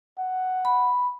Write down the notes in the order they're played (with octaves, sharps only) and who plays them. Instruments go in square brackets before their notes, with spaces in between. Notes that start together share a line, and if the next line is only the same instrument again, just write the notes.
[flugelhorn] F#5
[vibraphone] B5